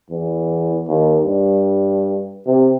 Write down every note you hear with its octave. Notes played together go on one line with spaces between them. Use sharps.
E2
D#2
G2
C3